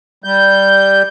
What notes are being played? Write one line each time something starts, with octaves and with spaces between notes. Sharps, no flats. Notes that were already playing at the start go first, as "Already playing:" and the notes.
G3 G6